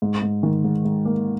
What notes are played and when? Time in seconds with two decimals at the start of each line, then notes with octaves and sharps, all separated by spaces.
0.02 G#2
0.22 G#2
0.43 D#3
0.64 G#2
0.85 G#2
1.05 A#3